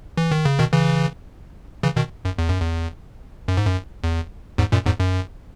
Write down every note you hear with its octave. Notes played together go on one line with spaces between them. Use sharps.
E3
D#3
C#3
B2 D#3
C#3 E3
C#3 E3
B2 D#3
F#2
E2
F#2
E2
F#2
G#2
F#2
E2
E2 G#2
F#2 A#2
E2 G#2
F#2